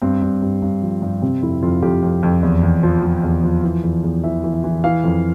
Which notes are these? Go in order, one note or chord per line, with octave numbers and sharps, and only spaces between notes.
G2 C4
G2
G2
G2
F3
G2
C3 C4
F2 E4
F2 F4
F2 G4
F2
F2
E2
E2
F3
F3
E2
F3
E3
E2
E2
E3 E5
E3
E5
E3
E3 F5
F2